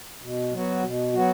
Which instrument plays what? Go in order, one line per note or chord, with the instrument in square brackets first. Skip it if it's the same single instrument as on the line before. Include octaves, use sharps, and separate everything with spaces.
[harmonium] B2
F#3 B3 F#4
B2
F#3 B3 F#4